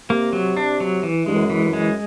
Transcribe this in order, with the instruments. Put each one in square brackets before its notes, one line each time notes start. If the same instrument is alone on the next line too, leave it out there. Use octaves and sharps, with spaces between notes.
[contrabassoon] C3 [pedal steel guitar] A#3
[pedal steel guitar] F#3
D4
F#3
E3
[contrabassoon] G2 [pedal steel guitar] G#3
[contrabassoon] F#2
[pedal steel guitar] E3
[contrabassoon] F#2
[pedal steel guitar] G#3